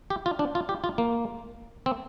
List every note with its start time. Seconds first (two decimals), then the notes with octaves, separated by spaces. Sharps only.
0.10 G4
0.26 F4
0.39 D4
0.55 F4
0.69 G4
0.84 F4
0.98 A#3
1.86 C4